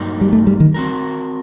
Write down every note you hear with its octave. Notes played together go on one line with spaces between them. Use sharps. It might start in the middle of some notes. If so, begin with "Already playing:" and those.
Already playing: G2 F#3 A#3 D#4
G3
A3
G3
D#3
C4 F#4 A#4